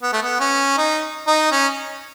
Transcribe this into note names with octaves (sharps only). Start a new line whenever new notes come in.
B3
A3
B3
C#4
D#4
D#4
C#4